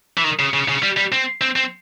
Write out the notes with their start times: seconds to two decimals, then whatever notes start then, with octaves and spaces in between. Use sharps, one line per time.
0.17 E3
0.24 D#3
0.39 C#3
0.54 C#3
0.69 C#3
0.83 G3
0.97 G3
1.12 C4
1.41 C4
1.56 C4